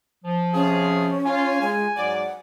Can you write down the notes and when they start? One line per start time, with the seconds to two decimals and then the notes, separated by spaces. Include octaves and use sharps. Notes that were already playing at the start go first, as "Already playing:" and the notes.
0.24 F3
0.54 C3 C#4 F4 G#4
1.26 F4 G#5
1.61 G#3
1.97 G#2 F#3 D5 F#5